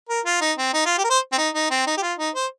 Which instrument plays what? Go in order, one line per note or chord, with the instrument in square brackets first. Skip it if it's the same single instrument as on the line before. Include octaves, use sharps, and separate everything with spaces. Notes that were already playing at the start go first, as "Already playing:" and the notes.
[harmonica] A#4
F4
D#4
C4
D#4
F4
G4
A#4
C5
C4
D#4
D#4
C4
D#4
G4
F4
D#4
C5